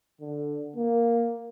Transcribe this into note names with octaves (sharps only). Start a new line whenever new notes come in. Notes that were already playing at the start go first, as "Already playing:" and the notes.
D3
A#3